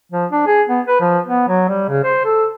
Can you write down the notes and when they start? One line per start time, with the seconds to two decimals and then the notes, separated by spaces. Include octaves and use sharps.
0.12 F3
0.31 D4
0.47 G#4
0.69 B3
0.87 B4
1.01 F3
1.28 B3
1.48 F#3
1.69 G3
1.89 C#3
2.04 C5
2.25 A4